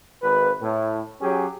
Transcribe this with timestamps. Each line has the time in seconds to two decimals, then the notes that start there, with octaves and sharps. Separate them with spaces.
0.23 G#1 B4
0.62 A2
1.21 F#3 C#4 G4 G#4